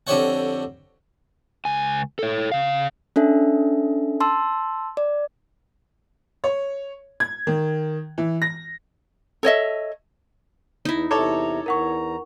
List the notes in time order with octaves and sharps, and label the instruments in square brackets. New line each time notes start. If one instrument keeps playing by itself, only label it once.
[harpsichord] F2 D3 G4 C5 C#5 F#5
[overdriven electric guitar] C#2 G#5
A4 C#5
C#3 F5
[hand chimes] C#4 D4 A4 E5
A5 C6 E6
D5
[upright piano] C#5
G#6
D#3
E3
A#6
[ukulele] A4 C#5 D#5 E5
[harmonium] E2 [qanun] D#4 E4
[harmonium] E2 C3 A#5 [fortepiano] A4 C#5 A5 [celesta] D6
[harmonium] E2 A#5 [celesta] A#4 F#5 C#6